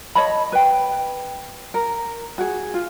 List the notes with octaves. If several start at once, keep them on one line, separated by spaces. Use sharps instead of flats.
C#5 D#5 A5 B5
B4 G5
A#4
F#4 G#4
F4